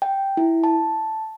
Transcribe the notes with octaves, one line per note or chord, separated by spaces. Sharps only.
G5
E4
A5